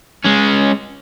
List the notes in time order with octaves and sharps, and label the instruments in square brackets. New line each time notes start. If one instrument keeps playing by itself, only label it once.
[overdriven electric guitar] G#3 C#4